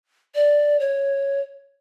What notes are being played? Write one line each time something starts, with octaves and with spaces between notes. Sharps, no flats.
D5
C#5